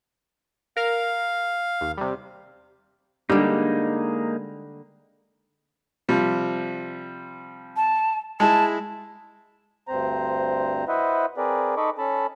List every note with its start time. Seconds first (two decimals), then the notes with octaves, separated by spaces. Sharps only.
0.77 A#4 F5 F6
1.81 D#2
1.97 C3 G3
3.30 D3 G3 G#3 A#3 D#4
6.09 C3 F3 G3
7.77 A5
8.40 G#3 E4 A5
9.87 D2 G2 C4 C5 A#5
10.88 E4 B4 C5 D#5 E5 F#5
11.37 C4 G#4 A#4 B4 D5
11.77 D#4 A4 D#5 B5 C#6 D6
11.98 C#4 A4 A5 B5